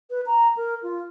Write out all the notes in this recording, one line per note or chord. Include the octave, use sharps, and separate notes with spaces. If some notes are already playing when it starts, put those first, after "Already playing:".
B4
A#5
A#4
F4